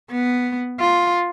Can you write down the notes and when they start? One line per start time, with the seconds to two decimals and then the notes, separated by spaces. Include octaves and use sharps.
0.12 B3
0.80 F4